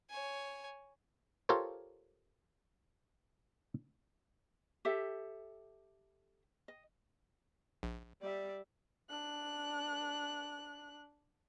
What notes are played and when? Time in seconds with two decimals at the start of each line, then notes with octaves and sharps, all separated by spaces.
0.10 C#5 G#5
1.49 F4 G4 A4 A#4 C5 C#5
4.85 G4 A4 E5
6.68 D#5
7.83 A#1
8.21 G3 D5 E5
9.10 D4 F#6